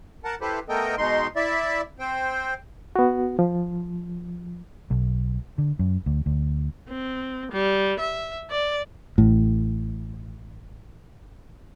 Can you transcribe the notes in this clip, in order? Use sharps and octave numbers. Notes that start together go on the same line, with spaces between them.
A#4 F#5 A5
E4 G4 A4 B4 C5
A3 B3 A4 A#4 D#5 G5
B2 G#3 D#4 C6
E4 D5 E5
C4 C5 G5
B3 F#4
F3
B1
D3
F#2
D2
D2
C4
G3
E5
D5
A1 A2